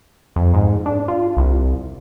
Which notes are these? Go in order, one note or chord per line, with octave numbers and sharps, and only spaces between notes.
F2
G#2
D4
F4
C2